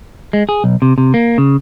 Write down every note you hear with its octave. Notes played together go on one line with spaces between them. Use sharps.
G#3
G#4
B1
C3
C3
A#3
C#3